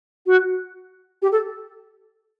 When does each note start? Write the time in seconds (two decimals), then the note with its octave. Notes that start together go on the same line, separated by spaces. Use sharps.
0.26 F#4
1.22 G4
1.32 A4